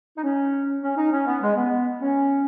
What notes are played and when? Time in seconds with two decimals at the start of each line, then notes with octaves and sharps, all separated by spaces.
0.16 D#4
0.23 C#4
0.82 C#4
0.96 D#4
1.11 C#4
1.27 B3
1.41 G#3
1.55 B3
2.00 C#4